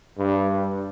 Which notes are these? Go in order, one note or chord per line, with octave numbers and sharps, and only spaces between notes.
G2